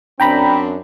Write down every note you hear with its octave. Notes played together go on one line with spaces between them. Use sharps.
F#2 C4 D4 G5 A#5 B5